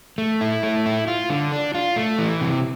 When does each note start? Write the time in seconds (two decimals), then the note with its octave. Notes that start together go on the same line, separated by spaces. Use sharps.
0.18 A3
0.41 E4
0.63 A3
0.86 E4
1.08 F4
1.30 D3
1.52 D4
1.74 F4
1.96 A3
2.19 E3
2.41 C3